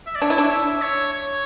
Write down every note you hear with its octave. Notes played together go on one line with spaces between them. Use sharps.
E5
D5
D4 C#5
E4
D4
E5
C#5
C#5